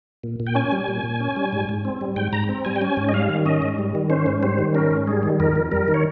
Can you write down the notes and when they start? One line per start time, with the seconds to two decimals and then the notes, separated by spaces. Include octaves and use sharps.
0.24 A#2
0.40 A#2
0.47 G5
0.55 C#4 G#5
0.72 G3
0.88 A#2
1.04 A#2
1.20 C#4
1.36 G3
1.52 G#2
1.69 G#2
1.85 C4
2.01 G3
2.16 G#2 G5
2.32 G#2 A#5
2.49 C4
2.65 G3 G#5
2.76 G5
2.81 C#4 G#5
2.97 G#2
3.09 D#5
3.13 G3 F5
3.29 D#3
3.46 C#4 D#5
3.62 G#2
3.78 G3
3.95 D#3
4.10 C#4 C5
4.26 G#2
4.43 G3 C5
4.59 D#3
4.75 C#4 A#4
4.91 G#2
5.07 G3 G#4
5.23 D#3
5.40 F2 A#4
5.55 F2
5.71 G3 A#4
5.88 D#3
5.94 C#5